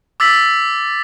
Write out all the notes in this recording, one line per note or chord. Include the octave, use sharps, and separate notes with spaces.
D6 E6 A6 B6 F#7